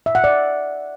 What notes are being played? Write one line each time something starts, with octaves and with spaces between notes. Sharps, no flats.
E5
F#5
D5